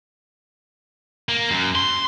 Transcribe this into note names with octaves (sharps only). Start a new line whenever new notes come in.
A#3
F#2
C6